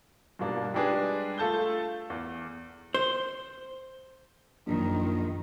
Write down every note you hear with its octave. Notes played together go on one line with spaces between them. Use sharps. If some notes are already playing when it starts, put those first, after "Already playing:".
G2 B2 G#3 A#3 D4
G3 G#3 D4 G#4 B4
A3 F4 A4 A5 G6 G7
E2
C5
A#1 F#2 D#3